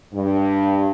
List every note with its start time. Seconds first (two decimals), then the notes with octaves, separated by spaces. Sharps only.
0.13 G2